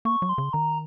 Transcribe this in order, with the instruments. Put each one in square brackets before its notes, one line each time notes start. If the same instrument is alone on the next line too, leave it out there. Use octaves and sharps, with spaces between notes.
[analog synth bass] A#3 [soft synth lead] C#6
[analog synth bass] F#3
[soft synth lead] C6
[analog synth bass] C#3
[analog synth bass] D#3 [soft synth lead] A#5